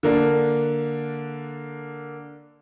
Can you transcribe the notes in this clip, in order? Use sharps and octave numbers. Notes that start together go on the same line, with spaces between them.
D3 A#3 D4